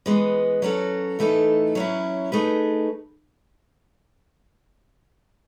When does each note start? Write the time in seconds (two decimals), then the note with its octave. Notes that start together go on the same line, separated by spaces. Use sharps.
0.06 E3 G#3 B3
0.62 F#3 C#4 F#4 A4
1.19 A2 E3 A3 D#4 A4
1.75 F#3 C#4 E4
2.32 A3 D#4 G#4 B4